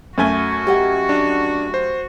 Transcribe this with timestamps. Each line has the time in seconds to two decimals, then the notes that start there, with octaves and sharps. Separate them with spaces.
0.18 F#2 A3 F#4 G#5
0.67 G4 D#5 F#5
1.09 D4
1.74 C5